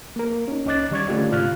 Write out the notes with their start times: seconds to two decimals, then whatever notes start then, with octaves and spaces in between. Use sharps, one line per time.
0.16 A#3 A#4
0.48 C#4 D#4
0.66 C#2 C#4 D#5 D6 F#6 A6
0.91 D#3 G3 D5 C#6 D6 G#6
1.08 D3 A3 C#4 F4 G4 D5
1.31 G#2 C3 F4 F6 F#6